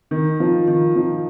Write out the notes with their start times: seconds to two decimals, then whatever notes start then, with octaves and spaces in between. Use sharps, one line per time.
0.11 D#3
0.40 F3
0.68 D#3
0.96 F3